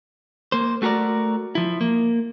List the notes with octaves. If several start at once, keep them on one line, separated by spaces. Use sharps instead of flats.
A#3 C5
A3 F#4 G#4 A#4 D5
F3 E4
A#3